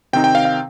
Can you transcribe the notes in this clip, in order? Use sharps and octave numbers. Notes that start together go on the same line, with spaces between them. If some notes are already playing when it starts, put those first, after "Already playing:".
C3 D#3 C4 D#4 G5
G5
F5
F5